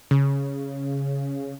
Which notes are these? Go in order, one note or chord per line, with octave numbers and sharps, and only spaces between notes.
C#3